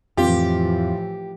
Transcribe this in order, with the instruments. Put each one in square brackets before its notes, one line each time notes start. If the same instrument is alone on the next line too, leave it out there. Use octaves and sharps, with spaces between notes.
[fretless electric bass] F2 C4 [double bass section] A2 E3 F3 [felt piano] F4 [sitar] G4